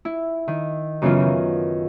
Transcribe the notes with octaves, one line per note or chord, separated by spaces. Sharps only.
E4
D#3
F#2 C#3 E3 B3 E4 F4
D#3